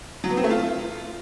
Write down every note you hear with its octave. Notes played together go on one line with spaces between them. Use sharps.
F#3
B3
C4
A3
F4